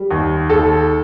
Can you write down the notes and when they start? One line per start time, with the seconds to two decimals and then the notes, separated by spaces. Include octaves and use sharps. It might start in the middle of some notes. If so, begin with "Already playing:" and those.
Already playing: G3
0.11 D#2
0.50 D#2 A4